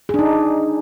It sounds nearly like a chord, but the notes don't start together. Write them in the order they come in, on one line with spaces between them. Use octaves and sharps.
G#4 D4 D#4